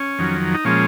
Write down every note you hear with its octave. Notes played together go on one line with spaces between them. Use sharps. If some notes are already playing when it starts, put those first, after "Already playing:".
Already playing: C#4
F2 D#3 F#3
D#4
A#2 F3 G#3 C#4